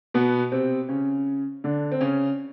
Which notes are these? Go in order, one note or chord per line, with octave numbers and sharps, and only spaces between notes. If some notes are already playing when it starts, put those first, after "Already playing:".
B2 B3
C3 C4
C#3 C#4
D3 D4
C4
C#3 C#4